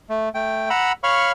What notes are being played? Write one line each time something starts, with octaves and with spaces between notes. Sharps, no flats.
A3
A3 G5
F#5 A#5 B5 E6
C#5 F5 B5 C#6 F6